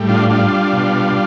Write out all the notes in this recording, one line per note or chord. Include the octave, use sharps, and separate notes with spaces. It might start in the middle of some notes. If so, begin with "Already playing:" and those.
Already playing: A2 G3
D4 F4
G3 D4 F4
B2